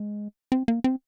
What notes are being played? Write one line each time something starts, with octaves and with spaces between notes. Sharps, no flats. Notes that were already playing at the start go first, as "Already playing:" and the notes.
Already playing: G#3
C4
A#3
C4